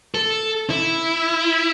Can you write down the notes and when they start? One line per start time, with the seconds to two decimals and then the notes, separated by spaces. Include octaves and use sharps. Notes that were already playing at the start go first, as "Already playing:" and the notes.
0.15 A4
0.70 E4